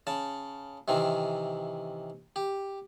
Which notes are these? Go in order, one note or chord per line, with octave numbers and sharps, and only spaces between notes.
C#3 A5
C3 D#3 E3 C4
G4